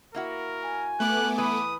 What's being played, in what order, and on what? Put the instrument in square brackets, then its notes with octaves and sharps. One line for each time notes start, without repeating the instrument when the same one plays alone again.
[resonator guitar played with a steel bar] A#3 E4 F#4 [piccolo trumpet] A#4
[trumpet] G#5
[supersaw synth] A3 B3 D6 [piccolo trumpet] F#6
[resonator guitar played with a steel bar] E3 B4 [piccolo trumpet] D#6